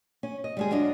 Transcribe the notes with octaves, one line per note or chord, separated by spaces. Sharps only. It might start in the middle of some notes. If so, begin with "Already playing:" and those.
C#4
D#5
G3 G#3 G#4
F#2 D4 F4 D#5